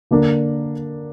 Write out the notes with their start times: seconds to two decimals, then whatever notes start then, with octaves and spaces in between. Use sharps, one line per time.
0.11 D3 A#3 D4 A#4